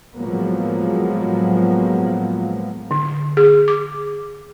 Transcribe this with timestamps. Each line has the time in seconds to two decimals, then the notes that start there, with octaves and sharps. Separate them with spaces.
0.18 A2 F3 F#3 G#3 A#3 B3
2.91 D3
3.37 G#4
3.68 D6